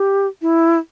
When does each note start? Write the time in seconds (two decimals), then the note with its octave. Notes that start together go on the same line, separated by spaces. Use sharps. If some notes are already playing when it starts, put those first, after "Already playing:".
Already playing: G4
0.42 E4